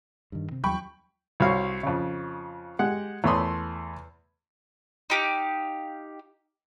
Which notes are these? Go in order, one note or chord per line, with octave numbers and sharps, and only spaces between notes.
G2 D#3
C3 C4
D#2 F#3 G3 G5 B5 C#6
C2 F#4 C#5 F5
F2 C#3
G#3 G4 F#5
E2 A3 C#5 B5 C6 D#6
D#4 G4 F5